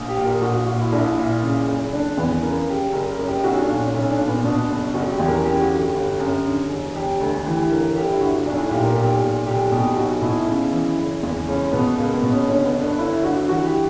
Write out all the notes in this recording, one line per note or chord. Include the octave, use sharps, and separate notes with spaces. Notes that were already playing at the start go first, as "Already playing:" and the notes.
Already playing: A#1
G4
A#2
A#4
A#1 F#4
A#2 F#4
E4
A#1 D4
E4
A#2
C#3
F#1
F#1 D4
E2 B3
C#3 A#4
F#1 G4
F#1 A#4
A#4
F#2
G4
B1 F#4
D4
A#2
C#4
B1 C#4
D4
A#2
B3
B2 D4
F#1
F#1 F#4
G4
E2
A#4
C#3 G4
F#4
G1
G4
G1
F#2
D3
E1
E1 G4
D2
E3 G4
G1 A#4
G1 G4
E4
G2 F#4
B1 D4
E4
A#2 G4
A#4
B1 G4
A#2
B1 G4
B2 G4
B1 F#4
B2 E4
C#3
E3
F#1
E2
C#2 C#4
B2 B3
C#2 A#3
B3
B2
C#4
D3 C#4
B3
G1
D4
G1 E4
G2 F#4
E3 F#4
G4